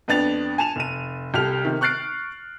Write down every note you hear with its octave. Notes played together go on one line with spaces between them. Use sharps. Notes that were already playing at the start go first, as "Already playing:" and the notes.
F2 B3 D4 A6 F7
G#5 A5 E7 F7
F1 D#7
C2 G4 A4 F6 F7
C3 D#3
C#6 F6 F#6 A6 C7 D7